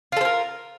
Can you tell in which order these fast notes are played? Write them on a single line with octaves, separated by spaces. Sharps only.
F4 A4 C5 A#4